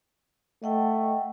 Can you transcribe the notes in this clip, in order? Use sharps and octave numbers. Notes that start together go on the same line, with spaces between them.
A3 D#5 F#5 G5